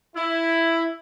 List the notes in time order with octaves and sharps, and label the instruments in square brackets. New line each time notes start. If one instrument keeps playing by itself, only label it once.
[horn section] E4